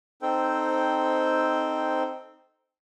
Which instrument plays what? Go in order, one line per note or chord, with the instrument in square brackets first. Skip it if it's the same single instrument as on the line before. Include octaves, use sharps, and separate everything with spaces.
[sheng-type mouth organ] C4 D#4 A4 C5 G5